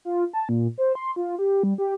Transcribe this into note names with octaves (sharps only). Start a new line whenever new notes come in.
F4
A5
A#2
C5
C6
F4
G4
G3
G4